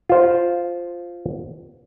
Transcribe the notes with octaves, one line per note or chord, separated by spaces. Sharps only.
F4 C5